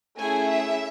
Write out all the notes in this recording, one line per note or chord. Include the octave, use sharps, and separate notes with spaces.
A3 C#4 E4 G#4 G#5
E5